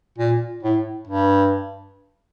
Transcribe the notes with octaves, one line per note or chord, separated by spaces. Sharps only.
A#2
A2
G2